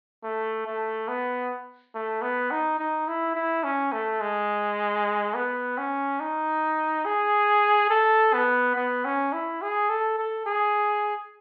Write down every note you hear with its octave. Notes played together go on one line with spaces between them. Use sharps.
A3
A3
B3
A3
B3
D#4
D#4
E4
E4
C#4
A3
G#3
B3
C#4
D#4
G#4
A4
B3
B3
C#4
E4
G#4
A4
A4
G#4